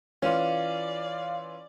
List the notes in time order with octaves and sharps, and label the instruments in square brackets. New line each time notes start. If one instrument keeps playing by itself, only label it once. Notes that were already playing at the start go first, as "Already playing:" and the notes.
[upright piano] E3 F4 [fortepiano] C#4 [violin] D5 [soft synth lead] F5